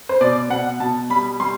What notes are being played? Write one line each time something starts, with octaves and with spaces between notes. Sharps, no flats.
C5
B2 D5
B2 F#5
B2 A5
G3 B5
G3 C6